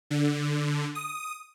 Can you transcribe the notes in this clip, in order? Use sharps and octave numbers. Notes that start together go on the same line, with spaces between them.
D3
D#6